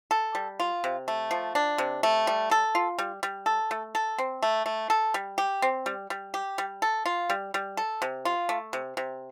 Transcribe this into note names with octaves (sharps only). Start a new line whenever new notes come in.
A4
G3
F4
C3
A3
F3
D4
C3
A3
G3
A4
F4
G3
G3
A4
A3
A4
C4
A3
A3
A4
G3
G4
C4
G3
G3
G4
G3
A4
F4
G3
G3
A4
C3
F4
A3
C3
C3